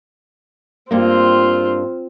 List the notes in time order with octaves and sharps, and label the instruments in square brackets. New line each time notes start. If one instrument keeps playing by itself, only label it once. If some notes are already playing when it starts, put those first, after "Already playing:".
[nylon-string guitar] G2 A#3 [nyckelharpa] C4 F4